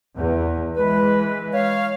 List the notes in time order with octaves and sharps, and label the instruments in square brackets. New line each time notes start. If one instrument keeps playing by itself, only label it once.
[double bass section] E2
[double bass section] E3 G#3 [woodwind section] B4
[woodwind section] C#5 F5